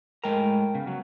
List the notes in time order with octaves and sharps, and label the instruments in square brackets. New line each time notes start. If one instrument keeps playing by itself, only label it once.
[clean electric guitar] A2 G#3 A#5 [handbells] A#4 G5 A5
[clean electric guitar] C#3 [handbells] B3
[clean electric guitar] F#3